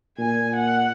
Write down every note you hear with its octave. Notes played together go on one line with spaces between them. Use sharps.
A#2 G#5
F#5